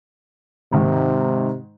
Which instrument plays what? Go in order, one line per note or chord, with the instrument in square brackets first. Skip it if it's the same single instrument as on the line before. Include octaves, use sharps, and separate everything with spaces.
[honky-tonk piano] G#2 D#3 D#4 [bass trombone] C3